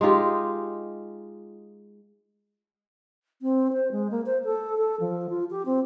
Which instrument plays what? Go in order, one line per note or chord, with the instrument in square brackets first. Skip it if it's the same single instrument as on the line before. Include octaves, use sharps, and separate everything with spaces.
[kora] G#3 D#4 F4 G4
[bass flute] C4
C5
G#3
A#3
C5
A4
A4
F3
F4
G4
C4